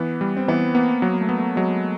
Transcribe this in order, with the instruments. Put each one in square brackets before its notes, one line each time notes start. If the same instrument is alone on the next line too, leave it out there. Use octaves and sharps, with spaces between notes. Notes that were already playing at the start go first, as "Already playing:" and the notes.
Already playing: [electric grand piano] E3 [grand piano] B3
[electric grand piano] G3
[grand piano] C4
[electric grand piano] E3 [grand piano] B3
[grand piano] A#3 [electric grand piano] B3
[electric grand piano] F#3 [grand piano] A#3
[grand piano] A#3
A3
[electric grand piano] B3
[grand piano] A3
[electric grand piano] F#3 [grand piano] G#3